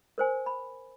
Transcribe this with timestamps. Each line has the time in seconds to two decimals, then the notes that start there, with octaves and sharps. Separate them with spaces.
0.18 A#4 C5 G#5
0.46 B5